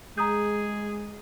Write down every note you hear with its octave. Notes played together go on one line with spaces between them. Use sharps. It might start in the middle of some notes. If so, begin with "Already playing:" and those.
G#3 G#4 A#5 D#6 G6